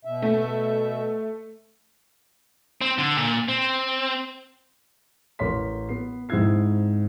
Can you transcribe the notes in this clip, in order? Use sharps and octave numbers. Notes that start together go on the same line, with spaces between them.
B2 E5
A3
C4
D3
A#2
C4
A1 A#4 C#5 C6 B6
B3 C7
G#2 C4 E4 E6 G#6 C7